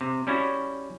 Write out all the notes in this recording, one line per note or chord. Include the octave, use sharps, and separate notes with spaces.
C3
G3 C#4 E4 F#4